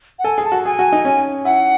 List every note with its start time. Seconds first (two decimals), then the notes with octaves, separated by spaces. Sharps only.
0.19 F#5
0.24 A4 G#5
0.38 G#4
0.45 A5
0.52 F#4
0.65 G#4 G#5
0.79 F#4
0.92 D#4
1.05 C#4
1.45 E4 F#5